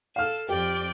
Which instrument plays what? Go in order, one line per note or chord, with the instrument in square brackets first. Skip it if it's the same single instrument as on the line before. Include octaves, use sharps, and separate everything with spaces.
[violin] A4 E7 [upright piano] F5 F6
[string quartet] F2 D5 [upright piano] G4 [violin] G5